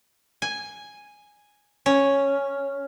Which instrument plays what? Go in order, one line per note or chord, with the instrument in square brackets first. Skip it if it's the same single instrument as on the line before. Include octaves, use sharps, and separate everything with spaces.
[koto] G#5
C#4